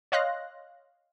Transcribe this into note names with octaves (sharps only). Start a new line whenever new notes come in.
C#5 D#5 F5 C6 F#6 A#6